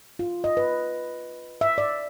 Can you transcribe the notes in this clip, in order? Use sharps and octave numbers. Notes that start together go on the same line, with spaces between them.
F4
D#5
B4
E5
D5